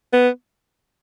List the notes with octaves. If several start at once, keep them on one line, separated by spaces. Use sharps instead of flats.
B3